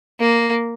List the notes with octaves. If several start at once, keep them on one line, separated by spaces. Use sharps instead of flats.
A#3